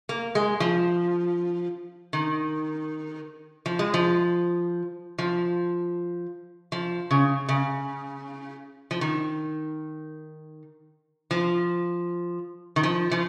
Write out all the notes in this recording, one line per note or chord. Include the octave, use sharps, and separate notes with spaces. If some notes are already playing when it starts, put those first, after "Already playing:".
A#3
G#3
F3
D#3
F3
G#3
F3
F3
F3
C#3
C#3
F3
D#3
F3
D#3
F3
F3